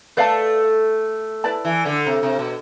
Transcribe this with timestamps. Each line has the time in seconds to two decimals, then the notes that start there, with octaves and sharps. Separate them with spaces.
0.17 A3 B4 D5 F5 A5
1.44 E4 B4 D5 A5
1.65 E3
1.85 D3
2.06 C3
2.23 C3
2.39 B2